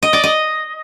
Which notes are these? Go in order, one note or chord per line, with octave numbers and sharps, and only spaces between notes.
D#5
D5
D#5